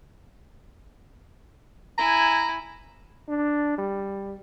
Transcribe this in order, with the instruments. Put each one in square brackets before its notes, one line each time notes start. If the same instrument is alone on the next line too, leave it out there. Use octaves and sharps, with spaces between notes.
[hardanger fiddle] E4 G#5 [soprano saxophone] A#5
[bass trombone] D4
G3